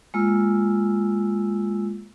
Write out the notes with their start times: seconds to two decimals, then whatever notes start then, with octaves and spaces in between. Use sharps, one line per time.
0.14 G#3 A#3 F4 E6